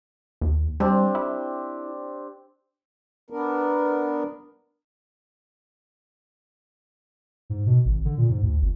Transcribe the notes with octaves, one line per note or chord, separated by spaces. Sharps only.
D#2
G3 C4 D4 G4
E4
B3 D4 A#4
G#2
B2
G#1
D3
A#2
G#2
D2
G1